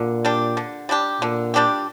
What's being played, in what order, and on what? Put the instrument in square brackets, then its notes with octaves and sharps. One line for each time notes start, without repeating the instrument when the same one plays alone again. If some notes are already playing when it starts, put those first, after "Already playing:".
Already playing: [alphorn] A#2 [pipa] D3
[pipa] G3 D4 G4
D3
G3 D4 G4
[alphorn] A#2 [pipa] D3
[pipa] G3 D4 G4